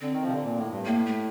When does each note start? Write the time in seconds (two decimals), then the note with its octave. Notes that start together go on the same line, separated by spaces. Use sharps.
0.01 D3 C4
0.13 D#3
0.22 F3
0.27 C3
0.33 D3
0.43 A#2
0.57 A2
0.71 G2
0.85 A2 A#3
1.06 A3